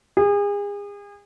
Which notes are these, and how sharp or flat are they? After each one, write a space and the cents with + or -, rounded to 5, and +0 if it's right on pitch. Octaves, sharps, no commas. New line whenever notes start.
G#4 -35